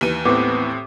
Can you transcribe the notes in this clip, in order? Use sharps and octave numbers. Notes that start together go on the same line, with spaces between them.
D#2 E3 D#7
A2 B3 C4 D6